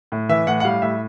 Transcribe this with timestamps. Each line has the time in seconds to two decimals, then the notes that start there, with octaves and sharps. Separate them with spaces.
0.12 A2
0.29 E3 E5
0.47 A2 F#5
0.60 F#5
0.65 G3 F5
0.82 A2 E5